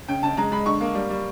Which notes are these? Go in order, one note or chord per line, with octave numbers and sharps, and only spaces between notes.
C#3 G5
C#3 A5
G#3 A#5
G#3 B5
D3 C#6
A#3
G3
G3